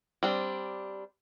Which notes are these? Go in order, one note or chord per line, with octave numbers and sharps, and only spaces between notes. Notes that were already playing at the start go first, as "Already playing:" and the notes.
G3 C4 D4